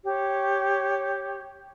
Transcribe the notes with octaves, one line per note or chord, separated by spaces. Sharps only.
G4 C#5